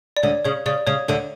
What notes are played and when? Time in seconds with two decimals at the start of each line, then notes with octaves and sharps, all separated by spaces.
0.17 D5
0.23 D2 D3 C#5
0.45 C#3 C#5
0.66 C#3 D5
0.87 C#3 C#5
1.08 D2 D3 C#5